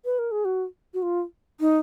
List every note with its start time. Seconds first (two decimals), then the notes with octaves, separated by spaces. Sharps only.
0.05 B4
0.19 A#4
0.32 G#4
0.45 F#4
0.94 F#4
1.02 F4
1.60 D#4